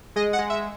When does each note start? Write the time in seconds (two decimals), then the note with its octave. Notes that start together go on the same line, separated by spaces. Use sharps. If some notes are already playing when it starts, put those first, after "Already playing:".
0.16 G#3 D#5
0.33 F#5
0.39 G#3
0.50 E5